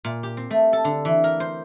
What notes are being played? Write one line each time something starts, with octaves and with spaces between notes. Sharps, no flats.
A#2
G4
C4
A3
A4
D3
E3
A#4
C5